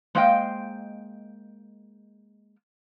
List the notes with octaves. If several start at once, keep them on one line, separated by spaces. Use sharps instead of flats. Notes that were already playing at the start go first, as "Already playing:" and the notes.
G#3 A#3 C5 D#5 F5 G5